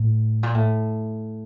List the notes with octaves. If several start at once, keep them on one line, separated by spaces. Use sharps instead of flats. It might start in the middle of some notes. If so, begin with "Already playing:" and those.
Already playing: A2
A#2
A2